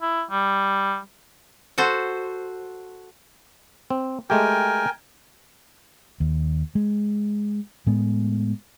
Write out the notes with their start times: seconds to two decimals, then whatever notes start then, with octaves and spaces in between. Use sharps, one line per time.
0.02 E4
0.31 G3
1.78 F#4 A4 C5
3.90 C4
4.30 G#3 A3 G4 A#4 G5 G#5
6.20 D#2
6.75 G#3
7.87 A2 G#3 B3